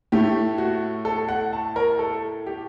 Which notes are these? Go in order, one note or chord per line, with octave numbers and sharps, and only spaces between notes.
A2 A3 G4
F#4
A4
F#5
A5
A#4
A4
G4